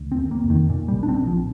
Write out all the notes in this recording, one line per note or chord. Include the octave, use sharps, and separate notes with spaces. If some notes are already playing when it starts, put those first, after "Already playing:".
Already playing: D2
C4
D#2
A#3
F1
D#3
A#2
G3
A#1
D4
C4
A#1
F3